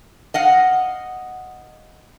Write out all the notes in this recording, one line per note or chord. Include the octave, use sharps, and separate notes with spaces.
D#5 F5 F#5